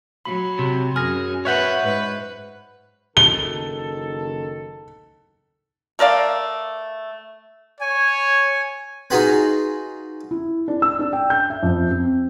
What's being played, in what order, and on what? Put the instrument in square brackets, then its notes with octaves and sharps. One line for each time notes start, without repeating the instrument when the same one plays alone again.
[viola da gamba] F#3 [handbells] B5
[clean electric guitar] C3
[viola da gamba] F#2 [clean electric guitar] G#4 [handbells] F6 A#6
[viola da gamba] B4 [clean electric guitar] C#5 E5 F#5 [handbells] C#6 F#6 G6
[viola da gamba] G#2 B4
[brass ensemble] F#1 D#3 A4 [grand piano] G7
[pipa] A3 A#4 D5 F5
[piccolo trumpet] C#5 [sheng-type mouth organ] G#5
[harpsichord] D#4 F4 F#4 G#4 B4
[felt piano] E4
D4
E6
D4
G5
G6
E5
F2
C4